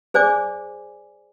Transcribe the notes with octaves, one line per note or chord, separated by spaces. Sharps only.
G#4 C5 D5 G#5 D6